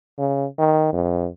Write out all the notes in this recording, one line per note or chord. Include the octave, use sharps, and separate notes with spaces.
C#3
D#3
F2